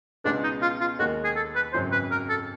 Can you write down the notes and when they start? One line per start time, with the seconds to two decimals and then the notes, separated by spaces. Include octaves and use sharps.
0.24 C#2 B2 G#3 B3 D4
0.43 D#4
0.62 F4
0.80 F4
0.99 D#2 D#3 G#3 F#4
1.24 G#4
1.36 A4
1.55 B4
1.73 G#1 F#2 C#3 F#3 C5
1.92 B4
2.11 A#4
2.29 A4